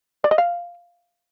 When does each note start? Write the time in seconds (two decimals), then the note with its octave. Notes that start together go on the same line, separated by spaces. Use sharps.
0.24 D5
0.31 D#5
0.38 F5